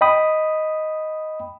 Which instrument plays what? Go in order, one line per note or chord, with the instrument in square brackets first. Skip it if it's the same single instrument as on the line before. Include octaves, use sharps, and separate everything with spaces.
[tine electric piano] D#5 G5 B5 D#6